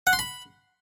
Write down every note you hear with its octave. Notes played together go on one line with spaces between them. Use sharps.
F#5
C6
B5